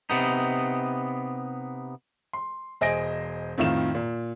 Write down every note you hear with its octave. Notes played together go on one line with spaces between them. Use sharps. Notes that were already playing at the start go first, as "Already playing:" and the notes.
C3 B3 D#4
C6
E1 C5 D#5 G#5 A#6 D7
F2 A2 D#3 F4 E7
A#2